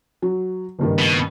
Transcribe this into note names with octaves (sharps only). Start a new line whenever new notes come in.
F#3
F#1 G2 D#3
B2